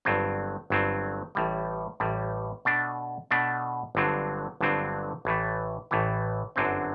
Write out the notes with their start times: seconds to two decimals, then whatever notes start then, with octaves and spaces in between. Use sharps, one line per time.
0.05 G1 G2 F#3 C4
0.70 G1 G2 F#3 C4
1.35 A1 A2 G3
2.00 A1 A2 G3
2.65 B2 A3 D4
3.31 B2 A3 D4
3.95 G1 G2 D3 F#3 C4
4.61 G1 G2 D3 F#3 C4
5.25 A1 A2 E3 A3
5.91 A1 A2 E3 A3
6.56 G1 F#2 D3 F#3 C4